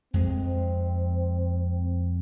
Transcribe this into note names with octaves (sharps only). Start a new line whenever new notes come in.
F2 G#3 C4